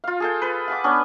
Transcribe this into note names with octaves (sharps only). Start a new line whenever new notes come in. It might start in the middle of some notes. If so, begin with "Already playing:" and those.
F4 F5
G#4 A4 G5
B4
F#5 G#5 D6
B3 C#4 D4 B4